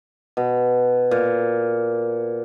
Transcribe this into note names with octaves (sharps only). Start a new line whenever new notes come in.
B2
A#2